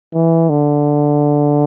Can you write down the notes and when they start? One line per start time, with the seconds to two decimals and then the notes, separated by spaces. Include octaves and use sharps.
0.14 E3
0.50 D3